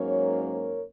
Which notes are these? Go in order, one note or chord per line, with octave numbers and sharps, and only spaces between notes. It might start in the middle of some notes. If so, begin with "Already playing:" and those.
Already playing: G#2 F#3 A#3 C#4 A#4 C#5
A#4 C#5